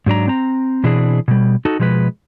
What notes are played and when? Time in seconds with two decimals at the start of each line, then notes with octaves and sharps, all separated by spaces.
0.06 G#2 F#3 D4 A#5
0.28 C4 A#5
0.84 B2 E3 C4 D4 G#4
1.28 B2 G3
1.65 D#4 F#4 A4
1.79 B2 F3 G#3 A#4 B4